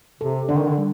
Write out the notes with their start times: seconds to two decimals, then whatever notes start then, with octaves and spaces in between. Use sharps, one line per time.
0.21 C3 A4
0.49 D3 D4
0.59 D#3
0.68 D3
0.78 G3